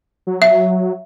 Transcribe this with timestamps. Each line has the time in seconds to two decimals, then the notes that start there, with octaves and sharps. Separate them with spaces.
0.27 F#3
0.42 E5